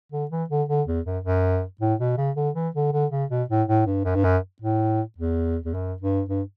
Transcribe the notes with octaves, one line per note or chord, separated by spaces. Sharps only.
D3
E3
D3
D3
E2
F#2
F#2
A2
B2
C#3
D3
E3
D3
D3
C#3
B2
A2
A2
G2
F#2
G2
F#2
A2
E2
E2
F#2
G2
G2